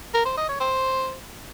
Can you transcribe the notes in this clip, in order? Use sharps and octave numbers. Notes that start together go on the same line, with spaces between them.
A#4
C5
D#5
C#5
C5